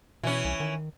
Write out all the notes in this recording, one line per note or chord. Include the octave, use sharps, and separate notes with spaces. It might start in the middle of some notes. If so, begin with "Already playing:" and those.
B2 E3 C#4
C2
D#3